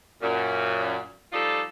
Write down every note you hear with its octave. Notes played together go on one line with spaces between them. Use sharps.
F#2 A#2
F3 G3 D#4 F4 A4 D5